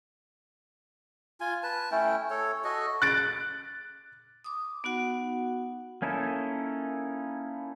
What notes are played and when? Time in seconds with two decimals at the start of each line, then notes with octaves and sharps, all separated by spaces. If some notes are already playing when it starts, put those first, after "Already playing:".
1.40 F4 G#5
1.63 B4 A5
1.91 A3 C#4 E4 G5
2.30 A4 C#5
2.64 F#4 A4 D#5
3.02 F#6 A6 D7
4.44 D6 D#6
4.84 B3 D#4 F#4 F#5
6.02 A#3 C#4 D#4 E4 A4